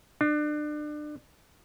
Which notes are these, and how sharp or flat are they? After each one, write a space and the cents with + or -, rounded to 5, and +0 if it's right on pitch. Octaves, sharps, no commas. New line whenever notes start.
D4 +30